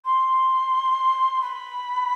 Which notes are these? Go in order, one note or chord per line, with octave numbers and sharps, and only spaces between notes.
C6
B5